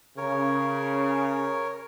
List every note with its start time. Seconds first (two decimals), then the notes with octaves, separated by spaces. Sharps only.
0.17 C#3 A#4 C#5